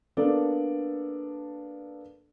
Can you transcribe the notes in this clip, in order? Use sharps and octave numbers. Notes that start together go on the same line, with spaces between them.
A#3 B3 D4 A4 D5